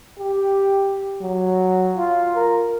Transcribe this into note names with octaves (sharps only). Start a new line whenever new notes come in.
G4
F#3
F4
A#4